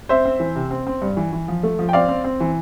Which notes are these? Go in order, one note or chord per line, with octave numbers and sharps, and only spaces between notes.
C4 C5 E5
C4
E3
C3
C4
C4
G2
E3
E3
F3
A3
F3
G5
C4 D5 F5
C4
C4
E3